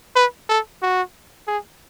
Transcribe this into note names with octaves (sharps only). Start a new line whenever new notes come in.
B4
A4
F#4
G#4